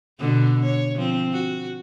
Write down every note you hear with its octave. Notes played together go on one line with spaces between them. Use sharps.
B2 D3 B3
C#5
F3 C4
F#4